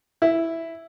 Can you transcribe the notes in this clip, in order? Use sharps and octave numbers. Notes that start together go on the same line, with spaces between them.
E4